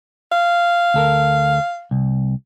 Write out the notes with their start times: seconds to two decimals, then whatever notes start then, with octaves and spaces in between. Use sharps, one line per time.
0.32 F5
0.94 D2 A4 A#4
1.91 C2